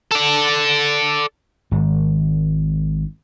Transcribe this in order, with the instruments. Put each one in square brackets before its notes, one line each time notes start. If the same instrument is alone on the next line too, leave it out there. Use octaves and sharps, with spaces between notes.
[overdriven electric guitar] A4 D5
[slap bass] G#1 G#2